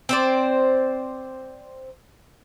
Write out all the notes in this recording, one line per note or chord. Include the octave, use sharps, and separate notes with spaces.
C4 C5 D5